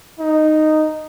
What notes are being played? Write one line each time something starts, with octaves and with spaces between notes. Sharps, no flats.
D#4